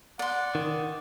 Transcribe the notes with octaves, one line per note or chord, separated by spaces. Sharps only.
D5 F#5 C6
D#3